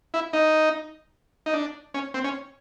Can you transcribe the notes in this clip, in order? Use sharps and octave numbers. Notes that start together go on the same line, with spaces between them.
E4
D#4
D#4
D4
C#4
C4
C#4